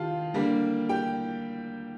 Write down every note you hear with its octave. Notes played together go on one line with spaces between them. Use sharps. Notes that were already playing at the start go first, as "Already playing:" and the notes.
Already playing: D#3 F4 G4 F5 A5
D3 G3 A#3
G4 G5